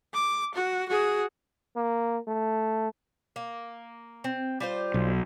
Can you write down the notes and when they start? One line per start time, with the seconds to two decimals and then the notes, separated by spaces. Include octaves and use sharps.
0.14 D6
0.54 F#4
0.89 F#4 G#4
1.76 A#3
2.28 A3
3.36 A#3
4.24 C4
4.60 G3 F4 C5
4.94 B1